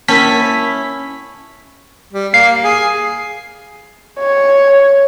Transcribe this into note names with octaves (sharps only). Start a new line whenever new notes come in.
A#3 C#4 E4 A#4 A5 B6
G3
A#3 C7
G#4
C#5